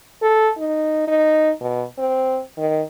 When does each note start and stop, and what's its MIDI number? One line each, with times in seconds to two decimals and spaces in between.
0.22 0.50 69
0.58 1.06 63
1.07 1.51 63
1.61 1.84 47
1.98 2.40 60
2.58 2.81 51